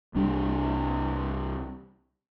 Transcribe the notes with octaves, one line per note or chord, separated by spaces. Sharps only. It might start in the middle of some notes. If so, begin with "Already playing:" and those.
C2 G3 A#3 D4